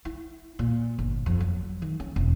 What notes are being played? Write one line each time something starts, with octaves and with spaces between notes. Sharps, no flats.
E4
A#2
G1
F2
F#3
D#3
C#4
E1